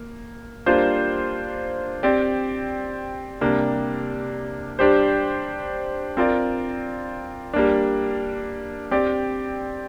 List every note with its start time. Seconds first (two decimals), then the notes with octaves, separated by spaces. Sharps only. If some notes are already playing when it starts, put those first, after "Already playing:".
Already playing: A#3
0.66 G3 A#3 D4 F4 C5
2.03 C4 G4 D5
3.41 C3 G3 A#3 D4
4.79 G3 D4 G4 C5
6.17 C4 F4 A#4 D5
7.54 G3 A#3 D4
8.91 C4 G4 D5